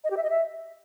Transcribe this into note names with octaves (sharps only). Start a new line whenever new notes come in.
D#5
G4
E5
D#5
E5